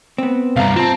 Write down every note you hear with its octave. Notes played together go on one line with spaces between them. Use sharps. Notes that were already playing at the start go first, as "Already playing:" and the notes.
B3 C4
C2 G2 F5 A#5
C4 F4 A5